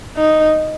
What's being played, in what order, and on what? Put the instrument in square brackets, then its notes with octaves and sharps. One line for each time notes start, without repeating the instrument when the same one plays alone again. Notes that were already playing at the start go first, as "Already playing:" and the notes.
[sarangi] D#4